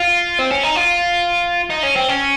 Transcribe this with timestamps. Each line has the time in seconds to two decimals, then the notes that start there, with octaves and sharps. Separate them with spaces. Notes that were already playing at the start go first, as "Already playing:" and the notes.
Already playing: F4
0.39 C4
0.52 C#4
0.63 D#4
0.76 F4
1.70 D#4
1.83 C#4
1.96 C4
2.09 C#4